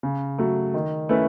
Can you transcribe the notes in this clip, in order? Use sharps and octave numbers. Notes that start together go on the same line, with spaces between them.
C#3
F#3 A3
D#3
A3 C#4 E4 B4